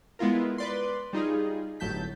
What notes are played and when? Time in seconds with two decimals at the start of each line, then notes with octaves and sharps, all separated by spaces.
0.19 G#3 B3 E4 F4 A#4
0.58 B4 D5 C6
1.13 G3 D#4 F4 G#4
1.80 G1 A2 F#3 A5 G6 B6